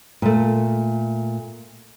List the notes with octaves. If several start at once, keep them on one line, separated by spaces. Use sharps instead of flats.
A#2 A3